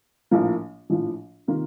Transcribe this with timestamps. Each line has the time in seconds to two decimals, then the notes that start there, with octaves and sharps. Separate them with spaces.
0.31 A#1 A2 F3 A#3
0.90 A#1 A2 F3
1.48 C3 D#3 A#3 F4